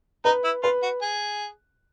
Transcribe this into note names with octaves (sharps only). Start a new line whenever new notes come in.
D#4 B4
E4
F4 B4
F#4
G#4